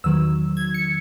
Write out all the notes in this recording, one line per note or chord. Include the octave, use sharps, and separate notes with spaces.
E2 D#3 F#3 E6
G#6
C#7